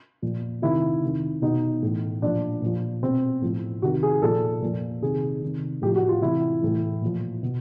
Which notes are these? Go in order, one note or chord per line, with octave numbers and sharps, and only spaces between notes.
A#2 F3
C3 D#3 E4
C3 D#3
B2 D#4
A2 E3
A#2 F3 D4
A#2 F3
B2 C4
A2 F3
C3 D#3 F#4
G#4
A#2 F3 A4
A#2 F3
C3 D#3 G#4
C3 D#3
A2 F3 G4
F#4
F4
C3 E3 E4
A2 E3
A#2 F3
B2